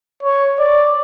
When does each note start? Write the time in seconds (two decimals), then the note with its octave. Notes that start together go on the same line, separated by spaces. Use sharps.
0.23 C#5
0.59 D5